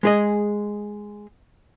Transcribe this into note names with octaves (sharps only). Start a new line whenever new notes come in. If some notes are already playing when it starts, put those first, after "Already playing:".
G#3 G#4 D#5